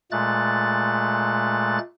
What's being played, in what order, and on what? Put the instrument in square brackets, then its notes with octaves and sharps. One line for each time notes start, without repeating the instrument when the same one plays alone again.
[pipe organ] A#2 G#3 A3 F#6 A6